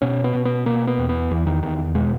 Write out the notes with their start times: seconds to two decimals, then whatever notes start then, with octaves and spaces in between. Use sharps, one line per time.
0.02 B2 C#4
0.24 B3
0.35 B2
0.45 B3
0.66 B2 A#3
0.87 B3
0.99 E2
1.09 B3
1.31 E2 E3
1.47 D#3
1.63 E2 D#3
1.95 B2 G#3